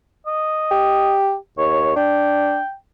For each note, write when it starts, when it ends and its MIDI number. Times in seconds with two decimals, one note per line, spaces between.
0.26 1.16 75
0.71 1.35 67
1.58 1.93 39
1.58 1.93 73
1.96 2.59 62
1.96 2.73 79